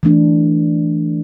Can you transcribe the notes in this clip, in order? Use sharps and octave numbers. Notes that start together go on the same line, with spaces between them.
E3 A3 D4